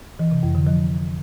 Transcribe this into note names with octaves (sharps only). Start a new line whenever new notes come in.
E3
C3
F2
D3
F3